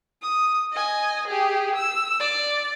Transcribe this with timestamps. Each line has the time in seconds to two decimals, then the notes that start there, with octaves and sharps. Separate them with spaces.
0.22 D#6
0.72 D#5 G#5
1.27 G4 G#4
1.75 E6
2.20 D5